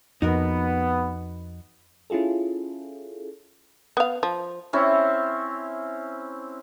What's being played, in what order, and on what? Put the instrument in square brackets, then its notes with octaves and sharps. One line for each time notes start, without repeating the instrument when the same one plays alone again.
[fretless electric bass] F2 [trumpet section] B3 [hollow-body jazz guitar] D#4 F#4 A#4
[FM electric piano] C#4 E4 F4 G#4 A4
[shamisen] B3 F5
F3
[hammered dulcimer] C4 C#4 E4